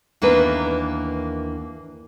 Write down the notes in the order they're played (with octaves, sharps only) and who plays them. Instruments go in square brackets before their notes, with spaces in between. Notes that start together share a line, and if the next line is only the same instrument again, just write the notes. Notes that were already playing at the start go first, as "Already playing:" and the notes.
[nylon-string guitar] D#2 E3 A#3 B3 D4 B4